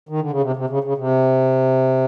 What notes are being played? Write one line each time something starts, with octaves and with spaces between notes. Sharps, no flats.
D#3
D3
C#3
C3
C3
C#3
C#3
C3